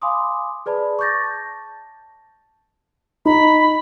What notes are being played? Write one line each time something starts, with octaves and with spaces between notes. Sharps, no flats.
F5 G#5 B5 C6 D6 D#6
G#4 B4 D5 A5 B5
C#6 D6 G6 A6 A#6
A5
D#4 B5